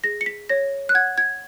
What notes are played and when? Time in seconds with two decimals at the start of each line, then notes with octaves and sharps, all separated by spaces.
0.04 G#4 A#6
0.21 C#7
0.26 B6
0.49 C#5 A#6
0.89 F#6
0.94 F#5 G#6
1.18 G#6